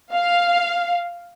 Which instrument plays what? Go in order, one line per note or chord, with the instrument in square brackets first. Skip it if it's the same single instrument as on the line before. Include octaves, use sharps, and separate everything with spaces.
[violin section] F5